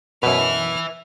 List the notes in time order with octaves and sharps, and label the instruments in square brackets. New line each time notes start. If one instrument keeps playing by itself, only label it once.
[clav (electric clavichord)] F#2 B2 [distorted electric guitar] B4 E5 [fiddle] F6